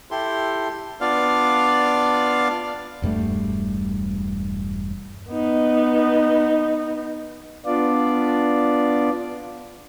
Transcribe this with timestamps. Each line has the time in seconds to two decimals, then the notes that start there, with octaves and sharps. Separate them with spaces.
0.11 E4 G4 A4 C6
1.01 B3 D4 F4 D5 F5
3.02 E1 G2 G3 A3
5.30 B3 D#4
7.66 B3 D4 F4 D5